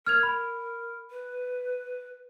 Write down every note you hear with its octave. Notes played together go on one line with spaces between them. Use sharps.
A#4 F6 G#6 F7
B5
B4